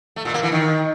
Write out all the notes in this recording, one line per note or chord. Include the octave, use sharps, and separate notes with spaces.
A3
A#2
A#3
E3
D#3